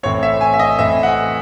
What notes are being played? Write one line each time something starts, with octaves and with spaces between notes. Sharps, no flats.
A2 E3 C4 C#5
E5
G#5
E5
D#5
A2 E3 C4 E5
F#5